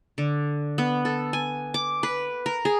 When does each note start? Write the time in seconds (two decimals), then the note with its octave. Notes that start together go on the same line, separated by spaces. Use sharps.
0.18 D3
0.78 B3
1.05 A4
1.33 G#5
1.74 D6
2.03 B4
2.46 A#4
2.65 G#4